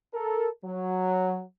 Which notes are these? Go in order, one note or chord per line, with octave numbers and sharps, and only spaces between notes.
A4 A#4
F#3